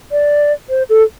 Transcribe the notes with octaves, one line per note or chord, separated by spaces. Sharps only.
D5
C5
A4